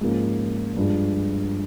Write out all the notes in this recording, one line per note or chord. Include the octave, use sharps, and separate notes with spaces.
G#2 F3 A#3 C#4
G2 F3 G#3